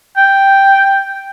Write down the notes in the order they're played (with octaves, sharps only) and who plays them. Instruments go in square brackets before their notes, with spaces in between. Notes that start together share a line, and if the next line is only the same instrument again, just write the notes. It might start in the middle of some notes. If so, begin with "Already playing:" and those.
[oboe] G5